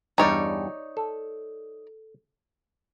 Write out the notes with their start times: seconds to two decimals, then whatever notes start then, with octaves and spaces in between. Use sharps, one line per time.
0.18 E2 G2 G3 D#4 C#5 D5
0.97 A4